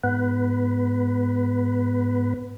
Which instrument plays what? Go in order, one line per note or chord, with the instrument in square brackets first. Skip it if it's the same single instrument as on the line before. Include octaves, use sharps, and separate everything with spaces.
[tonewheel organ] G#2 B3 B4